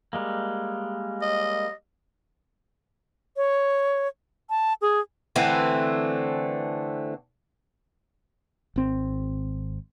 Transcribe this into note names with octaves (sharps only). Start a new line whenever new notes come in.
G3 G#3 A#3
D#5
C#5
A5
G#4
D3 E3 A3 C4
G#1 C4